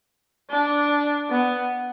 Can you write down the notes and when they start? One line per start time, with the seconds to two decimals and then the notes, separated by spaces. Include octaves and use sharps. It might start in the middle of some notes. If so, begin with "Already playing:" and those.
0.50 D4
1.30 B3